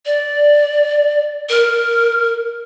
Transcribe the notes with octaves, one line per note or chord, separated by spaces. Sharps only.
D5
A#4